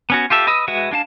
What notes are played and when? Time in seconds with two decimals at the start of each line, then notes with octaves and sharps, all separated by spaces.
0.10 B3 C#4 F#4
0.30 F4 G4 A4 E5
0.47 B4 D#5 D#6 E6
0.68 G#3 F#4 B4 E5 F#5
0.91 G#3 D4 F5 A5